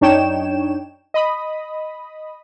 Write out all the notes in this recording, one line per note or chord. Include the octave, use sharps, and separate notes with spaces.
F#2 D4 D#4 C#5 G5 E7
D#5 B5 D#6